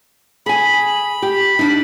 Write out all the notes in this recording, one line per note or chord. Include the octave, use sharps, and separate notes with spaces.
G#4 G#5 B5
G4
D4 D#4